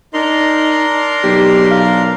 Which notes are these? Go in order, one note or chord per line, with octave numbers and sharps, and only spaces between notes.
D4 D#4 A#4 C6
B1 G4
F5